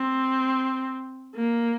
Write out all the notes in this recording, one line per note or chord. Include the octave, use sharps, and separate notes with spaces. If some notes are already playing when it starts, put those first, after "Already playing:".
Already playing: C4
A#3